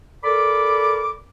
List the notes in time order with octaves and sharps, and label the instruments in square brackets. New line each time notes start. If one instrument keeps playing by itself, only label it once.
[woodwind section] A4 A#4 D5 B5 D6